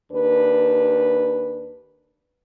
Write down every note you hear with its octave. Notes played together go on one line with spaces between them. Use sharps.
D#2 D4 B4